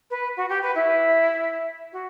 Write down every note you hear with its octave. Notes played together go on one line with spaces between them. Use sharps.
B4
F#4
G4
B4
E4
F#4